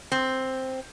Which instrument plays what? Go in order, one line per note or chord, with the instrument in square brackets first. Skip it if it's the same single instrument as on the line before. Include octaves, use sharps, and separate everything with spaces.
[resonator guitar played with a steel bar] C4